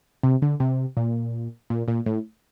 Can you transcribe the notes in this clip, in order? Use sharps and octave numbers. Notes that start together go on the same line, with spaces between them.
C3
D3
C3
A#2
A#2
A#2
A2